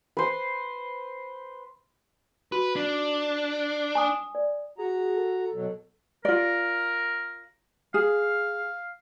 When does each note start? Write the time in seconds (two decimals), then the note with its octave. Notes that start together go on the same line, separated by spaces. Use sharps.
0.17 B4 C5
2.52 F#4 B4
2.76 D4
3.95 G#5 D6 D#6
4.35 D5
4.78 F#4 G#4 A#5
5.17 A4
5.53 B2 F#3
6.25 F4 A#4 D5
7.94 G#4 F5